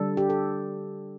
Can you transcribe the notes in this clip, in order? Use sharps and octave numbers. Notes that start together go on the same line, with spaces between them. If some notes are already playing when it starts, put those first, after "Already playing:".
Already playing: D3 G3 D4 A4
G4
A4